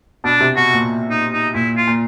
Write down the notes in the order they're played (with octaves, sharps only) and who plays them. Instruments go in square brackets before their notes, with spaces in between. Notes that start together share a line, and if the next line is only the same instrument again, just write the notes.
[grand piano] B2 [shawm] D4
[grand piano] C3
[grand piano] B2 [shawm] F#4
[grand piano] A#2
[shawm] D#4
D#4
[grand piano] A#2 [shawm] E4
[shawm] F4
[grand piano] A#2